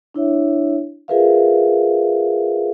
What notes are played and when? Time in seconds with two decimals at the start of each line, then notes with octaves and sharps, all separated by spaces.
0.14 D4 E4 C#5 E5
1.08 F4 G#4 A#4 B4 E5 F5